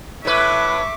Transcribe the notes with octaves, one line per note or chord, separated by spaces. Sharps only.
A2 B4 E5 C#6 D6